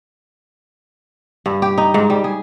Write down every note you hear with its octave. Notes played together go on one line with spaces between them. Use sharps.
G2
G4
D#4
G#2
G3
G#4